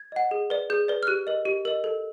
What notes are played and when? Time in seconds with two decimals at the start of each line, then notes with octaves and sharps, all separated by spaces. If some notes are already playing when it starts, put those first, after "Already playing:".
Already playing: G#6
0.12 D#5 F#5
0.31 G#4
0.50 B4 D5
0.70 G#4 G6
0.88 B4 D5
1.03 F6
1.07 G4 F#6
1.27 A#4 D#5
1.45 G4
1.65 A#4 D#5
1.84 A4